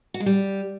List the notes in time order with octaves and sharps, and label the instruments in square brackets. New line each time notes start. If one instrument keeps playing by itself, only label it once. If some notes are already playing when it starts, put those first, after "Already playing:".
[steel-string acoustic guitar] F#4
G#3
G3